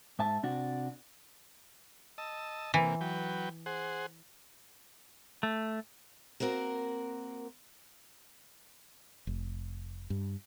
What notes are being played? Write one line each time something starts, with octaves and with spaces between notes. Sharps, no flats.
G#2 E5 A5
C3 D4 F#4
D#5 A5 E6
C3 E3 A#3
F#3 B4 G5
G#4 C5 F#5
A3
A#3 C4 F#4 A#4
F1
G2